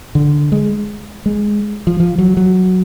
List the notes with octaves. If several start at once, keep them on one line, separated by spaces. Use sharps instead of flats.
D3
G#3
G#3
F3
F3
F#3
F#3